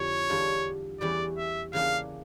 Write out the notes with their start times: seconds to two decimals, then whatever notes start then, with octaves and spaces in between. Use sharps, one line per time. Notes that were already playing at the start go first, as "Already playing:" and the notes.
Already playing: F2 D3 E4 G4 C#5
0.29 E2 D3 G3 D4 F4
1.01 E2 E3 G3 C#4 D5
1.38 E5
1.73 C#3 E3 A#3 D4 F5